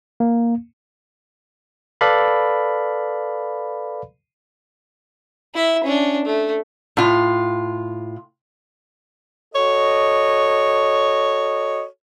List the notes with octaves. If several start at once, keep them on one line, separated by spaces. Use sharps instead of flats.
A#3
A4 B4 D5 F5 B5
E4 E5
C#4 D4
A3
A2 F4
F#4 A4 C#5 D#5